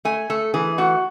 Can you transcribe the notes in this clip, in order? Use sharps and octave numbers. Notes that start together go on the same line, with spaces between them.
A3 G#5
A3 A4
E3 G#4
A3 F#4